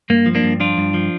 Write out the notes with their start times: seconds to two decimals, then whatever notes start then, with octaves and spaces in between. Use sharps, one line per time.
0.10 G2 A#3
0.26 F3
0.35 A#3 D4
0.44 G2
0.60 F3 D4 F4
0.78 G2
0.94 F3